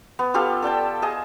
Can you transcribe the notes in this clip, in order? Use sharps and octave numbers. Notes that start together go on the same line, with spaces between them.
B3
F4 G4 A4 F5
A4 D5 G5 A5
G#4 D#5 A5